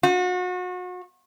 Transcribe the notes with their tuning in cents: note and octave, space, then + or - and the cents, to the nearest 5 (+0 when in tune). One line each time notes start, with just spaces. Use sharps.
F#4 -35